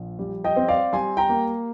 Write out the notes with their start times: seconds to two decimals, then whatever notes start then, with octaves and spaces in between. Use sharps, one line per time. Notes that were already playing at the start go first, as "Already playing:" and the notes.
Already playing: A#1 F3
0.19 G3
0.44 D#5 G5
0.56 C4
0.68 D5 F5
0.93 G3 G#5 C6
1.17 G5 A#5
1.29 A#3